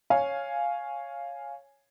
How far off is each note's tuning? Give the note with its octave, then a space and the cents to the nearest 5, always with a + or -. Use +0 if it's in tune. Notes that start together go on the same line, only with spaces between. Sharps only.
C#5 +0 F5 +0 G#5 +0